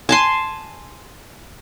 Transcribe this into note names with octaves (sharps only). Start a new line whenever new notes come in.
G#5 A5 C6